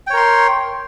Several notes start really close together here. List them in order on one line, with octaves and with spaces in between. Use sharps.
G5 C#5 A#4 C6